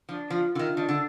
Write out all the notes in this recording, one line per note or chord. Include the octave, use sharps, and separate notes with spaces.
F3 D4
F3 F4
D3 F4
D#3
D#3 D4
D3